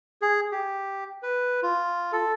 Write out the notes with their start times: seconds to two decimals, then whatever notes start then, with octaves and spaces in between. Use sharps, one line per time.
0.22 G#4
0.52 G4
1.23 B4
1.63 F4
2.12 A4